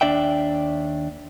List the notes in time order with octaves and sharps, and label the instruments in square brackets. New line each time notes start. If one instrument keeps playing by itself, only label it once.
[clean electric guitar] D#2 D4 D5 E5 G5